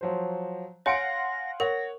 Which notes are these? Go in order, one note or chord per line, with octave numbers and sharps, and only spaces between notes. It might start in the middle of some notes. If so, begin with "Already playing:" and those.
F3 F#3 C5
C#5 F5 F#5 G#5 C6 A#6 C#7 D7
A#4 C#5 F#5 A#6